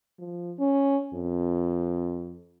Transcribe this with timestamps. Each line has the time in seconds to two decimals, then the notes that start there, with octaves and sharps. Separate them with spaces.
0.18 F3
0.59 C#4
1.14 F2